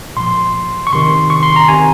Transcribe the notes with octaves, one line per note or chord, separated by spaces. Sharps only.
A#2 F3 C6
C#6
C3 D#3 C6
C#6
C6
A#5
C3 D#3 G#5